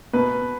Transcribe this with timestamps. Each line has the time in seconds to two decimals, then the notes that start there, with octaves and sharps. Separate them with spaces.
0.13 B2 B4